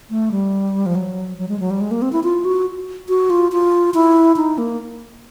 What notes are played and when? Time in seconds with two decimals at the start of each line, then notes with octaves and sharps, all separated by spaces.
0.10 A3
0.31 G3
0.86 F3
0.95 F#3
1.38 F#3
1.49 G#3
1.60 F#3
1.71 G3
1.81 G#3
1.91 A#3
2.02 C4
2.13 E4
2.23 F4
2.45 F#4
3.09 F#4
3.30 F4
3.52 F4
3.94 E4
4.36 D#4
4.58 A#3